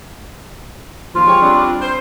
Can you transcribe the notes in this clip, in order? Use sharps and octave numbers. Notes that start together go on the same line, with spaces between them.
D#2 F3 F4
G#3 G4 C#5
G3 C4 D4
C5